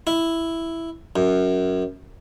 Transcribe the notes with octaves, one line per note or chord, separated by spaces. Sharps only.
E4
F#2